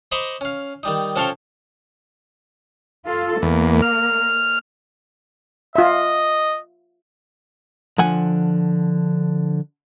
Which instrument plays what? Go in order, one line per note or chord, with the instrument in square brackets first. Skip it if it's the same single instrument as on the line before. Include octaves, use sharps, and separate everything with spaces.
[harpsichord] C5 D#5 A#5 B5 C#6 D6
C#4 F5
D#3 G3 D#4
F3 C#4 A4 C#5 F5 G5
[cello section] F4 A4
[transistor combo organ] E2 [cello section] A#3
[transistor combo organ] F6
[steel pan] F4 E5 [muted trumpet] D#5
[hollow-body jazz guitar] D3 F3 F#5 G#5